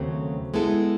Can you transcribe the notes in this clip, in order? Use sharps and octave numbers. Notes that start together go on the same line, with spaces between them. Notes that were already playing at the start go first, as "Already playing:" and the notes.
Already playing: D#2 C#3 F#3 A3 C4
G#3 B3 E4 A4